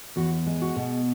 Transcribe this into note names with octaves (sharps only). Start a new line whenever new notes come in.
E2 F#4
G#3
F#4
B2